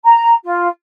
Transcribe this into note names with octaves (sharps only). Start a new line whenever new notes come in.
A#5
F4